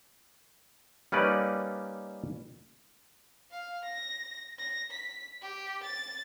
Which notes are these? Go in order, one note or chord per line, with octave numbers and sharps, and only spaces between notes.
G3 A#3 C#4 D#4 B4 D5
F5
A#6
A#6
B6
G4
A6